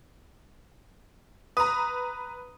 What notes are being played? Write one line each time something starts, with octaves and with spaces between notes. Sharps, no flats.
B4 A#5 D#6